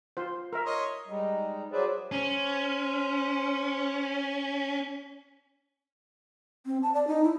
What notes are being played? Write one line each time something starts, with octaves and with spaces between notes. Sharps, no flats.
F4 C5
A#4 E5
C#5 D#5 C6
G3 G#3 D#4
F#3 G#4 B4 C5 D5 E5
C#4 C5
C4
A5
D5
D#4
E4